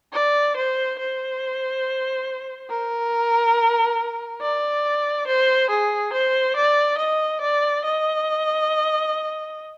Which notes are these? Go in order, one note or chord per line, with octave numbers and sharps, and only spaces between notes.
D5
C5
C5
A#4
D5
C5
G#4
C5
D5
D#5
D5
D#5